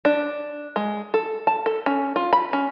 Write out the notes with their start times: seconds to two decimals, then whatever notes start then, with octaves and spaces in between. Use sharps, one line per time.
0.05 D4
0.76 G#3
1.14 A4
1.47 A5
1.66 A4
1.86 C#4
2.16 F4
2.33 B5
2.53 C#4